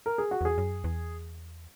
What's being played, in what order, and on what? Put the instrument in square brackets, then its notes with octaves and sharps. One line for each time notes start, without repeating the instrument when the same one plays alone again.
[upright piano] A#4
G#4
F#4
[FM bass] E2 [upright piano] G#4
[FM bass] F#2
E2